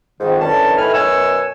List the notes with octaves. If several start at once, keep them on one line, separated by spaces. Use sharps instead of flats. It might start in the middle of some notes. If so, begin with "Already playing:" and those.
F2 G#2 D#3
F#2 D3 E3 C#4 A5
A2 D#3 A3 B4 G#5 F6
F#2 B2 C#5 F#5 G#5 E6